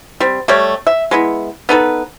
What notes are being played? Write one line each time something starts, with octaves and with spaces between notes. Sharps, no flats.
G3 C4
G3 A3 G4 C#5
E5
G#3 B3 E4
B3 D#4 A4 B4